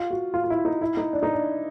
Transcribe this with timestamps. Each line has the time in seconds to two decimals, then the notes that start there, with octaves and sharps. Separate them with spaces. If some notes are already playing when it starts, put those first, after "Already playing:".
Already playing: F4
0.11 F#4
0.34 F4
0.44 F4
0.50 E4
0.65 D#4
0.81 E4
0.97 D#4
1.13 D4
1.23 D#4
1.33 D4